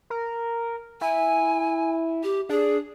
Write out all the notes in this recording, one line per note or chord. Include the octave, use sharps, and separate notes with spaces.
A#4
E4 G#5
G4
D4 G#4